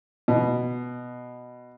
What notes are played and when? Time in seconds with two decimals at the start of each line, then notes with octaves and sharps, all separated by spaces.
0.28 B2